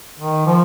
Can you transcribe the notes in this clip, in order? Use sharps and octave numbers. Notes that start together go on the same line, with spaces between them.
D#3
F3